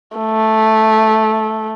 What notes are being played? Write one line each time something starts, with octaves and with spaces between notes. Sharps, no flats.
A3